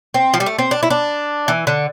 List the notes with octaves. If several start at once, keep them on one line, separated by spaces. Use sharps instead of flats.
C4
F3
G3
A3
C4
D4
E4
D4
E3
D3